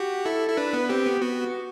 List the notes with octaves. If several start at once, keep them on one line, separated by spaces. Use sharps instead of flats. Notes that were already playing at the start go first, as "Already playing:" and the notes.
Already playing: F#4 G4
E4 A4
E4
D4 B4
B3
C4 G4
B3
B3 F#4